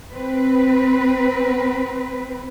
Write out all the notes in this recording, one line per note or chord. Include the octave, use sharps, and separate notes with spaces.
C4 B4